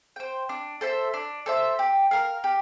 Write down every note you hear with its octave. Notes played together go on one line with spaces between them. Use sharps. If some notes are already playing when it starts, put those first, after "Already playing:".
C5 G5
D4
A4 C5 E5
D4
A4 C5 E5
G4
A#4 F5
G4